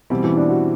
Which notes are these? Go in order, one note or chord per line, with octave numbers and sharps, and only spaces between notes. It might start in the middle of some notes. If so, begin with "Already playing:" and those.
B2 E3 G3 C4 E4
E3
D4
F#4